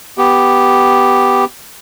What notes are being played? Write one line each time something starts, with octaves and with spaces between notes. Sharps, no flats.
B3 G4